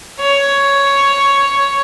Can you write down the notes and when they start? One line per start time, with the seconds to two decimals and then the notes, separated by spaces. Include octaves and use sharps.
0.20 C#5